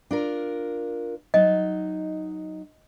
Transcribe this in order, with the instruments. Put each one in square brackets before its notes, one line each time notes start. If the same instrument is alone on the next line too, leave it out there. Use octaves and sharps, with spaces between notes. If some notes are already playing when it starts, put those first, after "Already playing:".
[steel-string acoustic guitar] D4 F4 A#4
[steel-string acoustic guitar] F#3 D#4 [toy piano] D#5